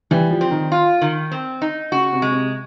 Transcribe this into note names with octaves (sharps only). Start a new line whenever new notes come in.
E3 G3
F3
C4
D#3
F4
D#3
C4
D#4
C#3 F#4
C3
G#3
C3